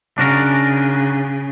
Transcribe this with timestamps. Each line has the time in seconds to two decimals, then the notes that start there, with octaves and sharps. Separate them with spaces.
0.18 C#3 D4 F#4 A#4